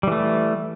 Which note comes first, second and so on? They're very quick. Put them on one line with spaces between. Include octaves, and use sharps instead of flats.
G3 E3 A3